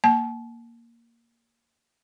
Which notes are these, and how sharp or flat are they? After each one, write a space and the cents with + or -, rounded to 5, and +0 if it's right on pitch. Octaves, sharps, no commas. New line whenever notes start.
A#3 +0 A5 -35